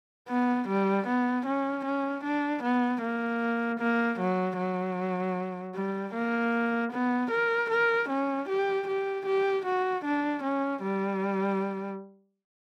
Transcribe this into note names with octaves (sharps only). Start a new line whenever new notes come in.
B3
G3
B3
C#4
C#4
D4
B3
A#3
A#3
F#3
F#3
G3
A#3
B3
A#4
A#4
C#4
G4
G4
G4
F#4
D4
C#4
G3